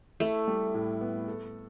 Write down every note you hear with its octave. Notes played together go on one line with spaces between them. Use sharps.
A3 E4
G3
A2
B3
A4